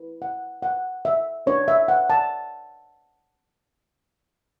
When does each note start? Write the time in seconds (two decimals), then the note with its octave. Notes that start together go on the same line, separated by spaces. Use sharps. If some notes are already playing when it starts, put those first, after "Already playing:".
Already playing: E4 B4
0.22 F#5
0.63 F#5
1.05 E5
1.46 D4 F#4 B4 C#5
1.68 E5
1.88 F#5
2.10 A5